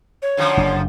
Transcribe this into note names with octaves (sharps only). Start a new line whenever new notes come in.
C#5
F#2 D3 F3
F#1 D4